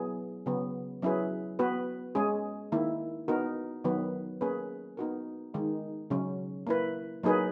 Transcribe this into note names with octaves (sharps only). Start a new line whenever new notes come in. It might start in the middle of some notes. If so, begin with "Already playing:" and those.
Already playing: F#3 B3 E4 G#4
C#3 F#3 B3
F#3 C#4 E4 G#4 B4
B3 F#4 B4
G#3 C#4 G#4
D#3 A#3 E4
B3 D#4 F#4 A#4
D#3 F#3 B3 F#4 B4
A#3 C#4 G#4 B4
B3 D#4 F#4 A#4
D#3 G#3 D#4
C#3 F#3 C#4
A#3 E4 B4
F#3 A#3 D#4 G#4 B4